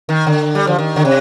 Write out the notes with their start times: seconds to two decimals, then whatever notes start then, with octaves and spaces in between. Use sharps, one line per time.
0.09 D#3
0.27 D3
0.55 G3
0.67 F3
0.78 D#3
0.96 D3
1.05 C3